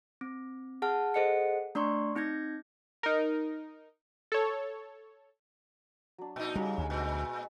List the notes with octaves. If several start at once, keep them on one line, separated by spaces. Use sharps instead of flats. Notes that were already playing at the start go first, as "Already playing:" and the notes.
C4
G#4 F#5 A5 F6
G#4 A4 C5 D#5 F#5 C#7
A3 D4 D5 C6 C#6
C4 D#4 G6 G#6 A#6
D#4 A#4
A4 C#5
F#3 D4
A#2 D#4
C#3 G3 D#4 F#4 G4
D2 C#5 G#5 B5
A#2 G#3